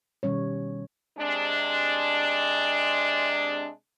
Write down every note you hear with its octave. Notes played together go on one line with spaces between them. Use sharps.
B2 D#3 G3 C#4 C#5
C3 G#3 D4